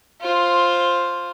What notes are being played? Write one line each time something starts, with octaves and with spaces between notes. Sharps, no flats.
F4 C5